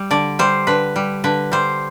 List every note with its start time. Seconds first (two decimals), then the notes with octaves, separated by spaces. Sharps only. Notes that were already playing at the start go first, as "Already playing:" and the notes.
Already playing: G3
0.11 D3 D5
0.39 G3 C5
0.67 D3 B4
0.96 G3
1.24 D3 B4
1.52 G3 C5